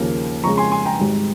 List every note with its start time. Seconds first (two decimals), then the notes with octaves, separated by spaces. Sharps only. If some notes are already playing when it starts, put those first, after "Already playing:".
Already playing: D#2 C#3 F3 A#3
0.44 F2 C#3 G#3 A#5 C#6
0.58 G#5 C6
0.72 G#5 C6
0.85 G5 A#5
1.00 G#1 G#2 G3